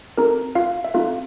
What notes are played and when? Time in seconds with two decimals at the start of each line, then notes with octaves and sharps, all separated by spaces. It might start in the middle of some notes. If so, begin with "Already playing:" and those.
0.18 C4 D#4 F#4 A4 A#4 A#5
0.55 F4 F5
0.84 E5
0.94 C4 D#4 F4 F#4 A4 F5